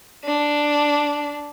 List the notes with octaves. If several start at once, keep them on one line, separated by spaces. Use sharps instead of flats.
D4